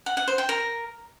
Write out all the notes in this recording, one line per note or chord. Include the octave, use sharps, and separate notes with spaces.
F#5
F#5
C5
G5
A#4